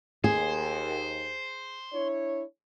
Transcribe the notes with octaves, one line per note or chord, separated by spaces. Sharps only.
D#2 G#4 C5
D4 E4 C#5